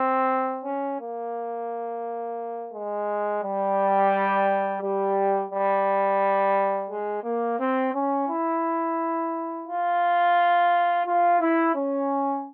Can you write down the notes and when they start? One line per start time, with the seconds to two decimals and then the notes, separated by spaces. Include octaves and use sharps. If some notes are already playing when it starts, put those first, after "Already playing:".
Already playing: C4
0.65 C#4
1.00 A#3
2.73 G#3
3.42 G3
4.82 G3
5.51 G3
6.90 G#3
7.23 A#3
7.59 C4
7.93 C#4
8.28 E4
9.67 F4
11.06 F4
11.40 E4
11.75 C#4